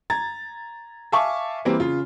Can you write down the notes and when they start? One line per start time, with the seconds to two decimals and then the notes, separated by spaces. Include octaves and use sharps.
0.10 A#5 G#6 A6
1.12 E5 F5 G#5 A5 C#6 D6
1.65 E3 G3 A#3 C4
1.80 C#3 F4